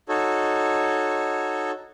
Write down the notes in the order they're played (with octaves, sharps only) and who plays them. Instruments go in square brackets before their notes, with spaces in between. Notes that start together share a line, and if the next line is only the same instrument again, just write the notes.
[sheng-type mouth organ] D#4 F#4 A4 C#5